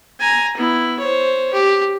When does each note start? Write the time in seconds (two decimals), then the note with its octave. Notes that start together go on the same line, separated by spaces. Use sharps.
0.20 G#5 A#5
0.57 B3 E4
0.99 C5 C#5
1.53 G4